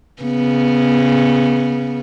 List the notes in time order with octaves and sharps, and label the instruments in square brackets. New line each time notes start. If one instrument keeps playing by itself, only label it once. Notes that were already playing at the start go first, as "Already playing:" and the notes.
[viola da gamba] C#3 B3